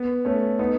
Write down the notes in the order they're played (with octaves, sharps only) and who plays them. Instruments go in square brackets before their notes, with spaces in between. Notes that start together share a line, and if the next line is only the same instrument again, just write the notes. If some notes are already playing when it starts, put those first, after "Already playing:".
Already playing: [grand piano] B3
A3 C#4
B3 D#4